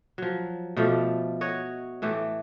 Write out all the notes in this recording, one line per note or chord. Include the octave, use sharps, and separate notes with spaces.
F3 F#3
B2 F3 A3 G4
F#4 C#5 D#5
A2 E3 A3 G4